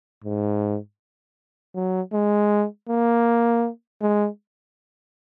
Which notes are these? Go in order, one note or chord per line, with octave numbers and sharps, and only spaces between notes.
G#2
F#3
G#3
A#3
G#3